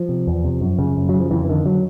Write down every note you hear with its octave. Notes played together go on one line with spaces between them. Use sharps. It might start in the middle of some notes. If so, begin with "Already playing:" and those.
Already playing: F3
C3
E2
C3
F#2
C#3
F#2
C#3 F#3
F3
F2 E3
E3
D3 D#3
F#3